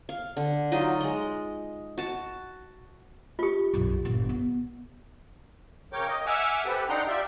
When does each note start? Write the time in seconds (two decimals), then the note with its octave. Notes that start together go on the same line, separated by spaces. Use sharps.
0.09 F5
0.37 D3
0.72 F#3 D#4 F4 D#5
1.01 G#3 D#5
1.98 F#4 A5
3.39 F4 G4
3.74 B1 F#2
4.05 G1 A#2
4.29 B3
5.93 C#3 A#4 C#5 G5 D6
6.08 D#5
6.26 E5 F#5 G#5 D6 E6 F6
6.65 C4 G4 A4 B4
6.89 D4 D#4 F#5 G5 A#5 C6
7.07 F4 G4 D5 E5 G5